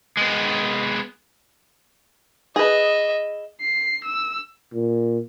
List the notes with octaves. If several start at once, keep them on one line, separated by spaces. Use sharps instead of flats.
G#3 B3
G#4 B4 D#5 E5
C7
E6
A#2